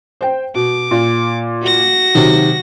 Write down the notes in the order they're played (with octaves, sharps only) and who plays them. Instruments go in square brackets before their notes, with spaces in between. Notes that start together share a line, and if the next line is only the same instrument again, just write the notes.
[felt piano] C5 G5
[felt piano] B2 [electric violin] D6
[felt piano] A#2
[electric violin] F#4 A#6
[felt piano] C3 D#3 F#3